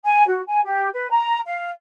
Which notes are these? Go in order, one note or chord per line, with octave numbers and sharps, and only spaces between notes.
G#5
F#4
G#5
G4
B4
A#5
F5